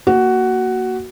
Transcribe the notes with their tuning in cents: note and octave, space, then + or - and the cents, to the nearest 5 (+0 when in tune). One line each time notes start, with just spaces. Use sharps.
A#3 +0 F#4 +10